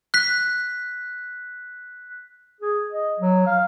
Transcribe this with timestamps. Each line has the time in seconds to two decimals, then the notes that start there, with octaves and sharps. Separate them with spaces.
0.14 F#6 B6
2.61 G#4
2.91 D#5
3.19 F#3
3.47 F5